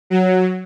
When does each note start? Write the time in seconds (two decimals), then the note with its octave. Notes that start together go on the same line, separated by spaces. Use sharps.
0.10 F#3